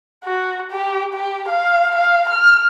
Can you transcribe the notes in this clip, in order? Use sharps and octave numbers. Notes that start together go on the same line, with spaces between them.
F#4
G4
G4
F5
F5
F6